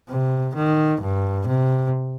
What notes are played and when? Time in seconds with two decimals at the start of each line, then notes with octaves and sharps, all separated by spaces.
0.09 C3
0.56 D#3
1.01 G2
1.47 C3